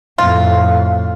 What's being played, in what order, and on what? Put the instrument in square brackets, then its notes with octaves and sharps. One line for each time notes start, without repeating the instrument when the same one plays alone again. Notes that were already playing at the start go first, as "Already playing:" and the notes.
[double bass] F2 A2 [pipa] F4